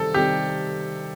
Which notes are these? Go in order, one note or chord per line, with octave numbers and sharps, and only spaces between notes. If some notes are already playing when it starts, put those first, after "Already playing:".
Already playing: C3 D#3 G3 C4 A4
C3 D#3 G3 C4 G4